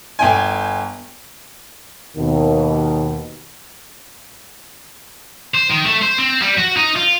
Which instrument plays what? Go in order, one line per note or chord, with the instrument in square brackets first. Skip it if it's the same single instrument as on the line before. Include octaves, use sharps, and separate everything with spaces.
[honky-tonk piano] G1 G5 G#5
[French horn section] D#2 B2 D#3
[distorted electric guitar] C5
D#3
A3
C5
C4
G3
F#4
D#4
F4